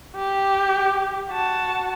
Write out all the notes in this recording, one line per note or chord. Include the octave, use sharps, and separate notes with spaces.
G4
F#4 A5